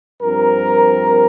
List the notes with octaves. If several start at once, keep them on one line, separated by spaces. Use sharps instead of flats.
G2 F3 C4 A#4